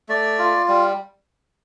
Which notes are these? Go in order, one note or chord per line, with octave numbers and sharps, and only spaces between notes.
A3 D5
F4
G3